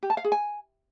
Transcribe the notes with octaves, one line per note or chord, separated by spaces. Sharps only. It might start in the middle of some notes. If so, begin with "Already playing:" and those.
G4
A5
F5
G#4
G#5